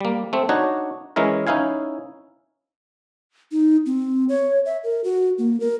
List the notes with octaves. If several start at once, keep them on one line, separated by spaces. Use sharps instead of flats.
G3 A#3
A3 C4
D4 D#4 F#4 C#5
E3 G#3 C#4 E4 A#4
C#4 D#4 E4 F5 G#5
D#4
C4
C#5
E5
A#4
F#4
A#3
A#4